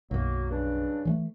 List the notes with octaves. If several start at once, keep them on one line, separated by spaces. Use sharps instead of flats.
B1 F#2 F#3 A#3
G2 C#3 D4
E3 F3 A3